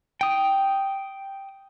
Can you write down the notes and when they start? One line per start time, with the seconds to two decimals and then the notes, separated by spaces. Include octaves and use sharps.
0.21 G5 D#6